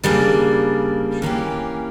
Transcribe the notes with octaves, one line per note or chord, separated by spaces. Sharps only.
C#3 G3 A#3 D4
E3 A#3 C#4 G4